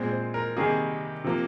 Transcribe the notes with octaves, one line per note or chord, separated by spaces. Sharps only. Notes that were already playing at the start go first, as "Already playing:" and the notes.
Already playing: A#2 G#3 C4
C5
A#4
C3 D#3 G3 A#3 G#4
C3 F3 A#3